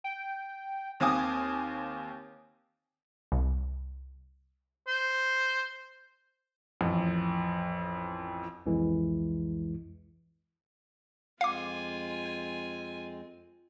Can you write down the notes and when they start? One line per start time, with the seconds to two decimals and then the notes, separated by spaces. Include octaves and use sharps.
0.04 G5
1.00 D#2 C4 F5 G#5 D6 D#6
3.32 C2
4.87 C5
6.81 A1 F2
8.66 C2 F2 E3 G#3
11.41 F2 G#3 C4 F4 F5 G#5 D6